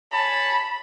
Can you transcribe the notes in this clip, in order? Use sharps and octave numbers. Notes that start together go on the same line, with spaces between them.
C#5 G#5 A5 B5